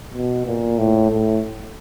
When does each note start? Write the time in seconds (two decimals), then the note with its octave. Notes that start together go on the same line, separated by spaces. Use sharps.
0.14 B2
0.46 A#2
0.78 A2
1.10 A2